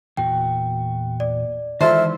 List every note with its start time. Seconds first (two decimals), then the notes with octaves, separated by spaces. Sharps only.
0.17 E2 A#2 F#4 G5
1.20 D5
1.81 D#3 E3 G#3 F4 A4 C5 E5